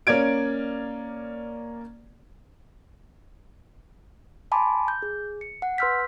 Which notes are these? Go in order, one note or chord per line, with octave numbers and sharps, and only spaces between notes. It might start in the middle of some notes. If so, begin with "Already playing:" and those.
A#3 C#4 D5 G#6 D7
G#5 A5 B5 C6 D6
G6
G#4
C#7
F#5
B4 C6 E6 F6 G6 B6